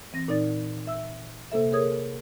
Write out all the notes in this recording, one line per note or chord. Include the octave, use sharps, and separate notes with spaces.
E3 C4 A#6
A#2 D#4 D5 A6
E5 E6
C3 A#3 A4 E5
G#4 A#4 C#5 D#6 G#6